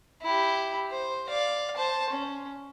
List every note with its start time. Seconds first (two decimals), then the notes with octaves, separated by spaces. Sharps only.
0.22 E4 G4
0.91 C5
1.29 D5 F5
1.76 C5 A5
2.10 C#4